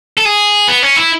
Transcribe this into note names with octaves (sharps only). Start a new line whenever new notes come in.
A4
G#4
B3
C#4
E4